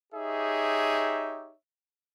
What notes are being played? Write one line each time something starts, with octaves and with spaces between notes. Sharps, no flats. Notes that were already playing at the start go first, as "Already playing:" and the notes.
D#4 G4 G#4 C#5 E5